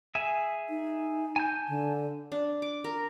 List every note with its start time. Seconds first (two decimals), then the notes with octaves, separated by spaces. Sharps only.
0.15 G#4 E5 G#5
0.69 D#4
1.36 G#5 A5 G6
1.68 D3
2.32 D4
2.62 D6
2.84 A#4